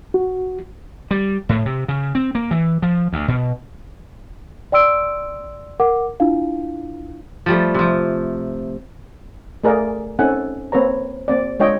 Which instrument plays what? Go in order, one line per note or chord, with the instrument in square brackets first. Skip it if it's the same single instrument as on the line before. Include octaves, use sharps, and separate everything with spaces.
[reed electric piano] F#4
[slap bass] G3
A2
C3
C#3
C4
A#3
E3
F3
D2
B2
[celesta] D5 G5 C6 E6 D7
A#4 F#5 D6
D4 E4 F4 F5
[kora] F3 G3 A3
C3 F3
[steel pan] A3 G#4 A#4 D5 F5
C4 C#4 D#4 A4 F#5 G#5
A#3 C4 B4 C#5 A#5
A#3 C4 D5
G#3 D4 F4 C#5 D#5 G5